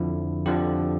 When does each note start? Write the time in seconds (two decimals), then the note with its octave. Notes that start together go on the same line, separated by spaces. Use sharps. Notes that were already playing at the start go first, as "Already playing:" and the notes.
Already playing: F2 D3 F3 E4
0.46 F2 D3 F3 G4